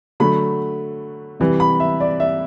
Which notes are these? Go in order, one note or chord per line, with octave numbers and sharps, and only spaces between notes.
D3 F#3 A3 B5
C3 E3 G3
B5
E5
D5
E5